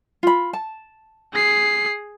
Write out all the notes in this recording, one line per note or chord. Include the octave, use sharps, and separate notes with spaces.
F4 B5
A5
G#4 C7